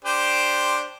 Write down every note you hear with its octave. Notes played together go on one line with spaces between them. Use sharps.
D4 G4 C5